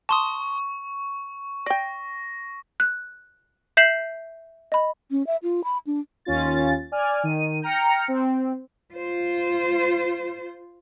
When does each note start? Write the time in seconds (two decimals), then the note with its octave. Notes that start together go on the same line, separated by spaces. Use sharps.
0.09 A5 C6 C#6 D#6
1.66 D5 G5 A#6
2.80 F#6
3.77 E5 G6 B6 C7 E7 F#7
4.72 D#5 B5
5.11 C#4
5.27 E5
5.43 F4
5.64 B5
5.87 D4
6.25 D#2 C#4 F4 A6
6.92 D5 G#5 F6
7.23 D#3 D#7
7.62 G5 A#5 F6 C#7
8.08 C4
8.94 F4 C5